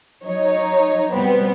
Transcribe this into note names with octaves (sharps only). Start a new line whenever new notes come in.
F#3 D#4 C#5
B2 G3 B3 C4